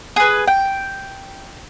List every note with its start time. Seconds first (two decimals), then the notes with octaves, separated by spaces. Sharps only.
0.16 G#4 B4
0.48 G5